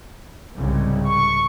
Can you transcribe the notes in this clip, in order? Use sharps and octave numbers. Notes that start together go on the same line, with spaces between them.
C2 G#2 C#3
C#6